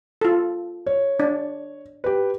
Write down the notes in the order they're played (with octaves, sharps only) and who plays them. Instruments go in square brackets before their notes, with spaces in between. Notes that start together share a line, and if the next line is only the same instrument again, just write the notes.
[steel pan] F4 A4
[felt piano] C#5
[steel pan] D4
[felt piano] G4 B4